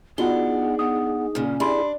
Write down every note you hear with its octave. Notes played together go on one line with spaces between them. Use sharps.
B3 D4 D#4 F4 F#4 G#4 G7
B3 D#6
A#2 C#3 C#4
D4 E4 G4 G#4 B5 C6